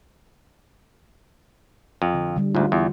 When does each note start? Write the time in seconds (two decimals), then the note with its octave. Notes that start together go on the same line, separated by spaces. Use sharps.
2.02 F2
2.14 D3
2.36 D3 G3
2.55 D2 G#2 F4
2.72 E2